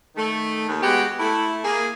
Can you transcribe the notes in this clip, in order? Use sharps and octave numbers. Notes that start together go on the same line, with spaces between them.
D#3 A3
D#2
G#3 B3 F#4 G4
A3 E4
A#3 G#4